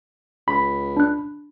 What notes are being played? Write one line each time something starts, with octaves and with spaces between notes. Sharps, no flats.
C#2 B5
D4 F#6